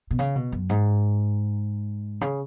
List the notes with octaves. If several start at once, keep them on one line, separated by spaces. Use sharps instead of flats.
B2
C#3
B2
F#2
G#2
C#3